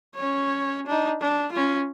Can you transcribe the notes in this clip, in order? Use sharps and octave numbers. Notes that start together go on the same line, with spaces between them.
C#4 C#5
D4 D#4
D4
C#4 F4